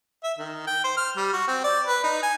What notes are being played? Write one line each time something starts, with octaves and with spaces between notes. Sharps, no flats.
E5
D#3
G5
C5
F6
G3
F#4
C4
D5
B4
D#4
G#5